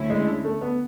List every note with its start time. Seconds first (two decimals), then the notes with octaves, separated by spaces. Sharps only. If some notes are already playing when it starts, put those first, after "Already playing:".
Already playing: D2 D3 A3 C#4 E4
0.10 G#3
0.45 A3
0.61 B3